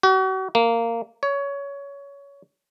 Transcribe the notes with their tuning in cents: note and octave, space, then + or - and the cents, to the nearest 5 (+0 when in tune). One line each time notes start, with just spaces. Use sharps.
F#4 +40
A#3 -15
C#5 +20